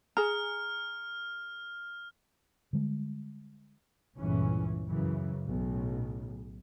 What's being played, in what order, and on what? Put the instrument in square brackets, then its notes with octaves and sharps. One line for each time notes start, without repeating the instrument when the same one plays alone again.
[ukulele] G#4 A#5 [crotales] F6
[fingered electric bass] D3 G3 G#3
[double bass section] G1 C#2 A#2 C#3 E3 C#4
F#2 C#3 E3
B1 A2 C#3